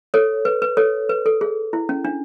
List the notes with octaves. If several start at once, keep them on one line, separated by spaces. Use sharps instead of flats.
A4 C#5
B4
B4
A4 C#5
B4
A4
G#4
E4
C#4
D4